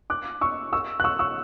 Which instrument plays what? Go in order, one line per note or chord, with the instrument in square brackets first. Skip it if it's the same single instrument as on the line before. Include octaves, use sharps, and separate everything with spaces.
[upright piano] D6 F#6
C#6 E6
C#6 E6
F#6
C#6 E6
C#6 E6